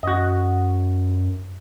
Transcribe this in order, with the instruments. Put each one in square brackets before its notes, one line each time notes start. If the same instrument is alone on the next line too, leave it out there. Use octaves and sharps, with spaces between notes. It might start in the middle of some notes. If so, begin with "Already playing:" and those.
[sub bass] F#2 [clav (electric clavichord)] F#4 D#5